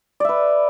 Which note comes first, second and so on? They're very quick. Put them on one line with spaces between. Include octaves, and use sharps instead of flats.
D5 E5 B4